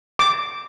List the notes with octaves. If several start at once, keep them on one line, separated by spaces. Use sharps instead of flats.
D6